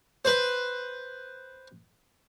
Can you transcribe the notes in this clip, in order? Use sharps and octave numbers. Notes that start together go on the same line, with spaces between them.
B4 C5